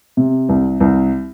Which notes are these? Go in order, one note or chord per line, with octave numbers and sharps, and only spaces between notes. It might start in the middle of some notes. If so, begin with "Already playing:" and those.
C3
C2
C2